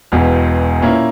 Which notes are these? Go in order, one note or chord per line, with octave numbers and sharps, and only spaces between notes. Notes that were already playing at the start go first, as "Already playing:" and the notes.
E1 E2 B2
A#2 A#3 C#4 E4